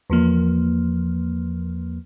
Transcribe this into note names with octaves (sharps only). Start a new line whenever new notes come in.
E2 F3 A#3